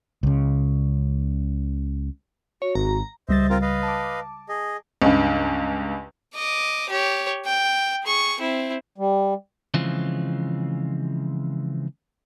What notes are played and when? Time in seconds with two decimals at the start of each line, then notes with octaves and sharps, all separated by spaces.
0.23 C#2 C#3
2.62 F#4 C#5
2.75 G#1 A#5
3.29 C#2 G3 C5 D#5 E5 A6
3.50 C4 F4 A#4
3.62 B4 D#5 F5
3.83 A5 D6
4.49 G#4 D#5
5.02 C#2 G2
6.35 D#5 D6
6.89 G4 C#5
7.46 G5
8.04 G#4 C#6
8.39 C4 E4
8.98 G3
9.74 C#3 E3 F3 G#3 C4 F4